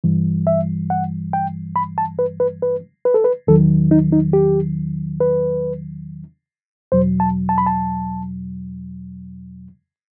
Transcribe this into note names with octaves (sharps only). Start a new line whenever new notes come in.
G2 E3 G3
E5
F#5
G5
B5
A5
B4
B4
B4
B4
A4
B4
E2 D#3 F#3 A4
D#4
D#4
G4
B4
E2 B2 F#3 C5
A5
A5
B5
A5